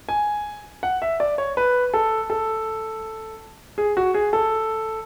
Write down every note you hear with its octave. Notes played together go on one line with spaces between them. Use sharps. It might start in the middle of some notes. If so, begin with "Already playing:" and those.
G#5
F#5
E5
D5
C#5
B4
A4
A4
G#4
F#4
G#4
A4